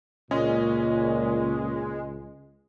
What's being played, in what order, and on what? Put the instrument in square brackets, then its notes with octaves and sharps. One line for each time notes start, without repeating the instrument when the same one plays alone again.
[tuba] C#2 [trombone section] A#2 [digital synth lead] G#3 [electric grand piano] C#4 D#5